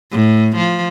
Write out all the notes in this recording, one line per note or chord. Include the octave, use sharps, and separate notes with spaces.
A2
F3